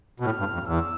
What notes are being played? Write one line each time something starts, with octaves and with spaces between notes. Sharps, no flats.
B2
A2 F6
G2
F2
E2 E6